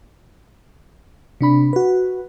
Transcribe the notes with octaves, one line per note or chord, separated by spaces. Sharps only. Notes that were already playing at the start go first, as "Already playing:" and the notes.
C3 D4 B5
F#4 B4